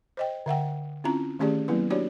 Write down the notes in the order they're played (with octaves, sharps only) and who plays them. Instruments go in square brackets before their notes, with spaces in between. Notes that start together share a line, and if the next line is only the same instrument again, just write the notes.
[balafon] C5 D#5 G5
D3 E5 F#5 G5
C4 C#4 E4 F4 A#5
D#3 A3 C#4 G4 G#4 D5
F#3 A#3 B3 E4 B4
D4 F#4 G4 C#5 D5